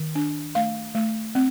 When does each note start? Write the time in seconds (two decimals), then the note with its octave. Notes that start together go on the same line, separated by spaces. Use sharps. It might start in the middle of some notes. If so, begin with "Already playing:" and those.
Already playing: D#3
0.15 D4
0.55 A3 F5
0.95 A3
1.35 C4